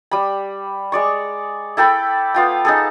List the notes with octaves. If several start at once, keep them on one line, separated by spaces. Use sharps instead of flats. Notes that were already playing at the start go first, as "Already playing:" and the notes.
G3 B5
G#3 D5 C#6
E4 A4 G5 B5
B3 F4 G5
D#4 G#4 A4